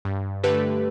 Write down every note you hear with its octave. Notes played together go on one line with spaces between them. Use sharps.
G2
D3 A3 G4 B4